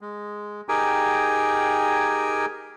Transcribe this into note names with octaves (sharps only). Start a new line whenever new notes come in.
G#3
D#4 G4 G#4 A#4 G5 G#5